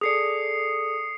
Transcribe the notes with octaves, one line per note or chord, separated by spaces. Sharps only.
G#4 A4 D5 D#6 C7 C#7